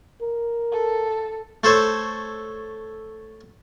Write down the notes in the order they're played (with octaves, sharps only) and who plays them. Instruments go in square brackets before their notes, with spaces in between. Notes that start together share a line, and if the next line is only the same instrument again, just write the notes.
[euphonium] A#4
[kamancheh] A4
[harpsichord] A3 A4 C5 C#5